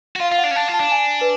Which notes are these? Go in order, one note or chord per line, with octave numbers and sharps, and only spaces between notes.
F#4
F4 F5
F4 F5
F#5
D4
C#4
D4 A5
F4
A5
D4
G#5
B4